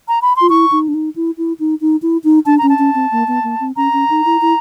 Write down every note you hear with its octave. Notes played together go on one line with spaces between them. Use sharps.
A#5
B5
F4 C6
E4 C#6
D#4
D4
D#4
E4
E4
D#4
D#4
E4
D#4
D4 A5
C#4 A#5
A5
C#4
C4
A#3
B3
A#3
C4
C#4 A#5
C#4
D#4
E4
E4